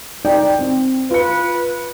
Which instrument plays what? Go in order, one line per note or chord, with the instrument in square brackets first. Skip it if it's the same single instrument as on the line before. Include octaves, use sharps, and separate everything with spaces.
[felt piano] D#4 D5 G5
C4
[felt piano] F4 C#7 [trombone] B4